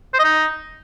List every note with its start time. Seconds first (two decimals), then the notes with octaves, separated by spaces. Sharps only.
0.14 C5
0.19 D#5
0.24 D#4